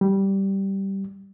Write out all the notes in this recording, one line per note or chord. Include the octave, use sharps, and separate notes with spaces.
G3